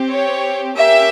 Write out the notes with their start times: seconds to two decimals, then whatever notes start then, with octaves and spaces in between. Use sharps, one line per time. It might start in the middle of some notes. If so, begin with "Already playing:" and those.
Already playing: C4 G4
0.10 C#5
0.76 A#3 C#4 G4 E5